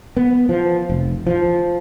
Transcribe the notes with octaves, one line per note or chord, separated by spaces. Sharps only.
B3
F3
F1
F3